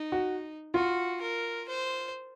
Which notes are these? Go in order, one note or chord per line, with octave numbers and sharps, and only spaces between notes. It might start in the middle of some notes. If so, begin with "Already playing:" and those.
Already playing: D#4
F#4
F4 F#4
A#4
C5